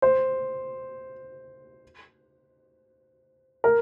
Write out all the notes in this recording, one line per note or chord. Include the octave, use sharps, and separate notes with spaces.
C5
A#4